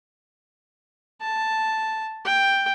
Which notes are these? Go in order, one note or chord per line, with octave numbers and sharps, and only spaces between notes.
A5
G5